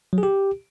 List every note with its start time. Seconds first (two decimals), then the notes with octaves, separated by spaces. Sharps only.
0.13 F#3
0.18 G#4
0.23 G4